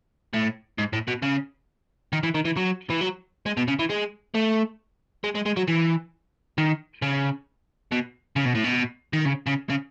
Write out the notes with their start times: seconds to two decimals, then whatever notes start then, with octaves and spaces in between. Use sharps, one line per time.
0.34 A2
0.79 G#2
0.93 A2
1.08 B2
1.23 C#3
2.13 D#3
2.23 E3
2.34 D#3
2.45 E3
2.57 F#3
2.90 E3
3.01 F#3
3.46 G#3
3.57 B2
3.68 C#3
3.79 E3
3.90 G#3
4.34 A3
5.24 G#3
5.35 G#3
5.46 G#3
5.57 F#3
5.68 E3
6.58 D#3
7.02 C#3
7.91 B2
8.36 C#3
8.45 B2
8.55 A2
8.64 B2
9.13 D#3
9.25 C#3
9.47 C#3
9.70 C#3